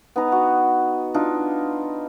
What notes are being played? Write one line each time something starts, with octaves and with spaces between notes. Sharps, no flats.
B3 D#4 A#5
F#4
D4 D#4 F4